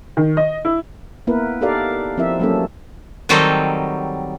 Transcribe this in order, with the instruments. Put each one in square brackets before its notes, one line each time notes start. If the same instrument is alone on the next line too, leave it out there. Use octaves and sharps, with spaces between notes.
[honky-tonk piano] D#3
D#5
E4
[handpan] A#3 B3 E4 A#4 B4
D#4 G4 A4 A#4 D5 F5
F3 C4 E4 A#4 E5
F#3 G3 A#3 C#4 A4
[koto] D#3 F#3 G3 C4 A4 D#5